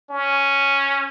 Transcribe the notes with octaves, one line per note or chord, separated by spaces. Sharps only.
C#4